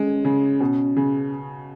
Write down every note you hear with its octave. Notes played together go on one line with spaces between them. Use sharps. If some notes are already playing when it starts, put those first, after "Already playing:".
Already playing: G#3 C#4
C#3
B2
C#3